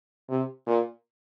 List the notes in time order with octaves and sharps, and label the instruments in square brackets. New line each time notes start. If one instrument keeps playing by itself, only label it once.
[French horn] C3
A#2